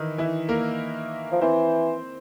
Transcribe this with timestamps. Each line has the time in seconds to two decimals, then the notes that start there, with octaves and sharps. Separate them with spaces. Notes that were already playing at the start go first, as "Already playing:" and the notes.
Already playing: D#3 E3 D#4 E4
0.18 E3 E4
0.49 A#3 A#4
1.32 F3
1.41 E3 C4 C5